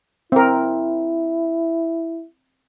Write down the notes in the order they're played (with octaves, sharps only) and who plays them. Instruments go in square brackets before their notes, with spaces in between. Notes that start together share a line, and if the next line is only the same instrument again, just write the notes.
[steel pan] C4 A#4 [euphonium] E4